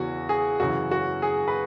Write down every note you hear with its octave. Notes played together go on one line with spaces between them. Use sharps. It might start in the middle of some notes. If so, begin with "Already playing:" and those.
Already playing: E2 C#3 E3 F#4
G#4
F#2 C#3 E3 F#4
F#4
G#4
B4